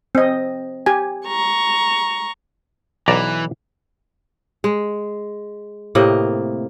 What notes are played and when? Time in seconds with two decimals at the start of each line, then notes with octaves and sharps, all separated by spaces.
0.15 C4 D#5
0.86 G4 G#5
1.27 A#5 C#6
3.08 B1 E3 D5 A#5
4.64 G#3
5.95 A2 C3 A#3 D#5